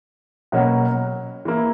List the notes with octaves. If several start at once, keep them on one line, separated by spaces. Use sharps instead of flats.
B2 F#3 A#3 C#4 F#4
E3 A#3 E4